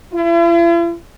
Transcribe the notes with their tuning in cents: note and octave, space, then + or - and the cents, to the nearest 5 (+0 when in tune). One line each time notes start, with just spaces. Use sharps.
E4 +45